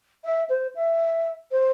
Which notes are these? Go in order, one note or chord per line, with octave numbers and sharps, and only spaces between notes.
E5
C5
E5
C5